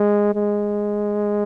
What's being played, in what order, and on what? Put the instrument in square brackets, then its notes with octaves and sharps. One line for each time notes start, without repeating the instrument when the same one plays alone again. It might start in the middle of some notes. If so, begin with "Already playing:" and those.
Already playing: [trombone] G#3
G#3